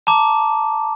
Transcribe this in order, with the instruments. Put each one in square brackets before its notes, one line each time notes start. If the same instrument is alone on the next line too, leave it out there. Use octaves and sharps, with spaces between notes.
[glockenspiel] A5 A#5 D6